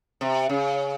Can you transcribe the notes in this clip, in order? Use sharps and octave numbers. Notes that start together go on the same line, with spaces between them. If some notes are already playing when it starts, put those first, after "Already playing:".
C3
C#3